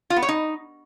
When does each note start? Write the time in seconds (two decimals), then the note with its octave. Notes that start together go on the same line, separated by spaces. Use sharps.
0.10 F4
0.16 B3
0.22 C#5
0.29 D#4